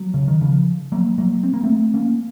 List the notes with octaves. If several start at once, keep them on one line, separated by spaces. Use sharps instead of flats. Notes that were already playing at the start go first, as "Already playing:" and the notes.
Already playing: F#3
C#3
D#3
C#3 F3
F#3 A#3
F#3 A#3
C4
A#3
A3 C4
A#3 C#4